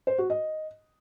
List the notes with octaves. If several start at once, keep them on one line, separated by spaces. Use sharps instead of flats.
C5
F#4
D#5